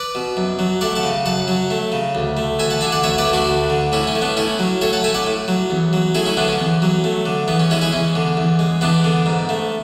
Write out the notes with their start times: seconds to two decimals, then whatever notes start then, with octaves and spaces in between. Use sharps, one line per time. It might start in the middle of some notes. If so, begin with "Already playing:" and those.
Already playing: B4 D5
0.15 B2
0.37 F#2
0.59 F#3
0.81 A3 D5 F#5
0.96 F#5 A5
1.03 C#3
1.26 F#2 F#5 A5
1.48 F#3
1.70 A3
1.92 C#3
2.15 D2
2.37 A3
2.59 D2 E5 G#5
2.70 F#5 A5
2.81 D3 E5 G#5
2.92 D5 F#5
3.03 D2 C#5 E5
3.18 B4 D5
3.25 A3
3.33 D4 F#4
3.48 D2
3.70 D3
3.92 A2 C#4 E4
4.07 C#4
4.15 A3
4.22 B3 D4
4.37 A2 C#4 E4
4.59 F#3
4.81 A2 A4 C#5
4.93 F#5 A5
5.03 A3 E5 G#5
5.14 D5 F#5
5.27 A2
5.48 F#3
5.70 E2
5.93 F#3
6.15 A3 E4 G#4
6.26 C#4 E4
6.37 D3 B3 D4
6.48 C#4
6.60 E2
6.82 F#3
7.04 A3
7.26 D3
7.48 E2 B3
7.59 C#4
7.70 G#3 C#4 E4
7.81 E4 G#4
7.93 E2 C#4
8.15 D3
8.37 E2
8.59 G#3
8.81 E2 B3 D4
9.04 D3
9.26 G#2
9.49 A3